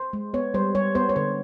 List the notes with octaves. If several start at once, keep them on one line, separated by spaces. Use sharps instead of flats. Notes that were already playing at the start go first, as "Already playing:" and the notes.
Already playing: C5
G#3
B3 C#5
G3 C5
G3 C#5
B3 C5
C#5
D3 C5